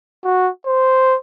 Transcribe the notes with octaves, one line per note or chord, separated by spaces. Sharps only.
F#4
C5